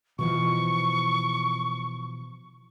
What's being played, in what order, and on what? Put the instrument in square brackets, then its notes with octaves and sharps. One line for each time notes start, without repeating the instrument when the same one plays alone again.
[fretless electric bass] B2 E3 F3 [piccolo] C#6